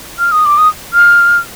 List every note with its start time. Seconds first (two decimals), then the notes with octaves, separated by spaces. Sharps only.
0.19 F6
0.32 D#6
0.46 D6
0.58 D#6
0.94 F6